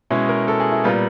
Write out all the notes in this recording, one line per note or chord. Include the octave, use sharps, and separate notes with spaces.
B2 G#3 C#4 E4
A#4
A4
G#4
E4
A#2 G3 B3 F4